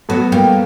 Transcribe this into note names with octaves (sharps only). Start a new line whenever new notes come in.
F#3 A3 B3
G3 A#3